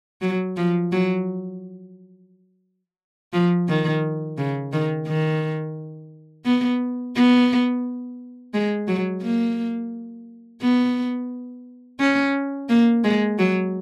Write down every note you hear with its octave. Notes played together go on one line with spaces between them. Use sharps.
F#3
F3
F#3
F3
D#3
C#3
D#3
D#3
B3
B3
G#3
F#3
A#3
B3
C#4
A#3
G#3
F#3